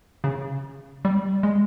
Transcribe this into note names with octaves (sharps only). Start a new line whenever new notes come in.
C#3
G3
G#3